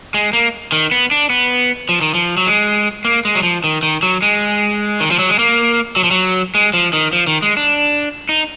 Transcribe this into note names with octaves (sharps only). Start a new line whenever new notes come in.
G#3
A#3
D#3
B3
D4
B3
F3
D#3
F3
F#3
G#3
A#3
G#3
F#3
F3
D#3
D#3
F#3
G#3
D#3
F3
F#3
G#3
A#3
F#3
F3
F#3
G#3
F3
D#3
F3
D#3
G#3
D4
D#4